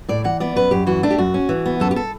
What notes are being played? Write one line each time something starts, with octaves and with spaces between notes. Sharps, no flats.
A2 D5
E3 F#5
B3 D5
F#2 B4
F#2 G4
E3 F#4
A3 D4
G4
F#2 F#4
C#4
E3
B3
F#2 A4
G4
A4